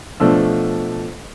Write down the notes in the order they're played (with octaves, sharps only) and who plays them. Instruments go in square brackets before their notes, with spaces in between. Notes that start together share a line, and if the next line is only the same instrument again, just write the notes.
[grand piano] B2 F3 A3 D4 E6